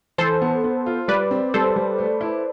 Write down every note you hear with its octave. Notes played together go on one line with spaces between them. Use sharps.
E3 A4 C5
B3
B3
F4
G3 B4 D5
C4
G3 A4 C5
G3
A3
E4